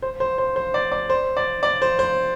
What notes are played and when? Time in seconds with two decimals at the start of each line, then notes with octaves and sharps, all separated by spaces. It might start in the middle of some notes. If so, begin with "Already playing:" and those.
0.02 C5
0.20 C5
0.38 C5
0.56 C5
0.74 D5
0.92 D5
1.10 C5
1.37 D5
1.63 D5
1.82 C5
1.99 C5